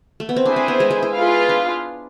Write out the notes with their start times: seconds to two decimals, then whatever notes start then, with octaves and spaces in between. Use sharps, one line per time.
0.20 A3
0.29 B3
0.36 C4
0.44 D4 E4 G#4 C5 G#5
0.56 C4
0.68 B3
0.80 G#3
0.91 G#3
1.02 E4
1.14 F4 G#4 B4 F5
1.49 D4